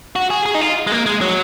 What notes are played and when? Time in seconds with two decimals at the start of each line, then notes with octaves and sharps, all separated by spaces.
0.16 F#4
0.30 G#4
0.46 G#4
0.54 D#4
0.61 F4
0.87 G#3
0.92 A#3
1.06 G#3
1.21 F#3